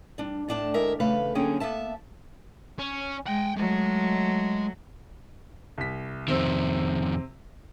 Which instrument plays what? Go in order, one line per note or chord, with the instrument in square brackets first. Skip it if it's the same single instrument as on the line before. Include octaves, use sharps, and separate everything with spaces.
[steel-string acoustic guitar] G3 D4
A2 D4 A5
D2 G#3 A#4 E5
E2 C#3 A3 B4 F5
D3 F#3 A#3 C#4 G#4 G5
A#3 B3 E5 A5
[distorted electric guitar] C#4
[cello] G#3 [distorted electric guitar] F#5 G5
[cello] F#3 A3 [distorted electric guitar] G#3
[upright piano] C2 B6
[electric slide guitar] F2 D#3 [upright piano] C3 C4 E6